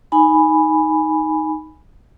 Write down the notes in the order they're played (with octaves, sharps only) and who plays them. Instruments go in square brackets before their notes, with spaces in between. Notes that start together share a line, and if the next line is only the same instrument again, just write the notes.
[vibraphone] D#4 G#5 B5